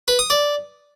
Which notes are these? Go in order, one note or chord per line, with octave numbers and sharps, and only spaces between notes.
B4
D#6
D5